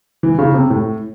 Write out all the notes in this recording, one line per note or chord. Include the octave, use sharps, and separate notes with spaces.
E3
C#3
C3
A2